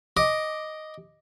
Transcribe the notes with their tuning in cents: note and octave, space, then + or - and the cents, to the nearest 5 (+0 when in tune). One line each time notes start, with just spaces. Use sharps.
D#5 +0 D6 +0